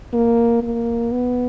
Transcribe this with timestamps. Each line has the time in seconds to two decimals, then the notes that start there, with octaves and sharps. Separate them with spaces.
0.13 A#3
0.63 A#3
1.12 B3